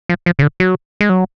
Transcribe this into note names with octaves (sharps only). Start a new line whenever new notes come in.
F3
F3
C#3
D3
F#3
G#3
F#3